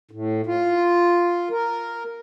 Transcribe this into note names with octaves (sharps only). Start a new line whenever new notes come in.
A2
F4
A#4